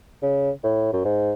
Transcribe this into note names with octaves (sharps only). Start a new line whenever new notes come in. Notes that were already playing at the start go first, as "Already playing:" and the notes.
C#3
A2
F#2
G#2